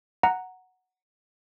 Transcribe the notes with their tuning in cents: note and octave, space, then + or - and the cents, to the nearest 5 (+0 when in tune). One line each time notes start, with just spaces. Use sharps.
F#5 +0 A#5 -5